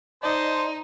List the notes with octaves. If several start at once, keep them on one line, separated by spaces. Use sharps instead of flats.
D#4 C5 D5 D#5 A5